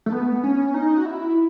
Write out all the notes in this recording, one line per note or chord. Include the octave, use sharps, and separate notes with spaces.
A3
B3
C#4
D#4
F#4
E4